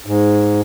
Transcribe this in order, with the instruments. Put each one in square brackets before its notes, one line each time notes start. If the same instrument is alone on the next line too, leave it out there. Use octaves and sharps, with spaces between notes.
[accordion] G#2